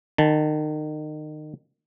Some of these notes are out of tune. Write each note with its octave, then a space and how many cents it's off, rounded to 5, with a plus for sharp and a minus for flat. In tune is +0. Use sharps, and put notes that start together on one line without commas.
D#3 -30 A5 +0